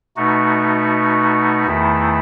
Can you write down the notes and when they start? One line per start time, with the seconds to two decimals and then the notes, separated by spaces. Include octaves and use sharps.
0.16 B2 A3 D#4 F#4
1.66 E2 D#3 A3 E4